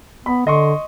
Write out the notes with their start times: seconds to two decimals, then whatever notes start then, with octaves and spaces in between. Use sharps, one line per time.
0.26 B3 B5
0.47 D3 D#5 C6 C#6